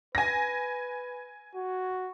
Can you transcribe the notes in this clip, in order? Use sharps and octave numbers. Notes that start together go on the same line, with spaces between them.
B4 G#5 A#6
F#4